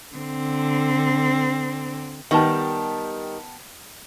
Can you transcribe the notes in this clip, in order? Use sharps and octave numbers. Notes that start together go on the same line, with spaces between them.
D3 C4
D#3 G3 B3 G4 A5